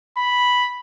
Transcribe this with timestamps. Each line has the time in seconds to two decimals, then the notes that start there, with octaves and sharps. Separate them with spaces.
0.17 B5